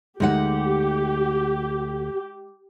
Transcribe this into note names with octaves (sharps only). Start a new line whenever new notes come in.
D2 G#3 D#4 G4 F#5